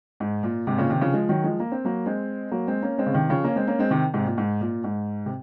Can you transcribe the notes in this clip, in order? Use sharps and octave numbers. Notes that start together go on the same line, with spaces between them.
G#2
A#2
G#2 C3
A#2 C#3
C3 D#3
C#3 F3
F3 G#3
D#3 F#3
F3 G#3
A#3
C4
F#3 A#3
G#3 C4
F#3 A#3
G#3 C4
A#3 C#4
G#3 C4
C#3
C3 D#3
C#3 F3
A#3 C#4
G#3 C4
A#3 C#4
G#3 C4
C3 D#3
G#2 C3
A#2
G#2
A#2
G#2
C3